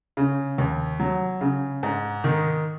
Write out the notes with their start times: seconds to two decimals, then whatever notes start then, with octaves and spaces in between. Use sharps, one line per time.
0.17 C#3
0.58 D#2
1.00 F#3
1.41 C#3
1.83 G#2
2.24 D#3